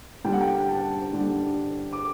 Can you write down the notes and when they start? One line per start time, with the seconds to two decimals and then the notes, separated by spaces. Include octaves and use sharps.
0.24 D3 G3 D4 G5
0.33 F#5
0.41 G5
0.69 A5
1.13 D3 G3 D4
1.93 D6